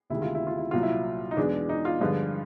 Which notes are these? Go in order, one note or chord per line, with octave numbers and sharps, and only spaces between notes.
D2 C3 D#3 G#3 E4
F4
E4
F4
E4
C2 A#2 F#3 F4
E4
D#4
E2 B2 G#3 D4
D#4
F4
G2 D3 F3 G#3